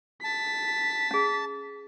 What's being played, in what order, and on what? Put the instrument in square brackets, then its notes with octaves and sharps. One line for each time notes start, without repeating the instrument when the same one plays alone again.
[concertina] A5 [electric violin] B6
[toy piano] C#4 G#4